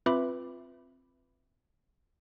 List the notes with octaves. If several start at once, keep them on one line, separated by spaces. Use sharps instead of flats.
C4 F4 B4 E5 B5 D6